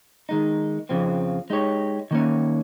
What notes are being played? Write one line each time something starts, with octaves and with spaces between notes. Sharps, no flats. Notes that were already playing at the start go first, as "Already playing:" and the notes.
D#3 G#3 D#4
F2 C#3 F3 C4
G#3 D#4 G4 C#5
D#3 A#3 C#4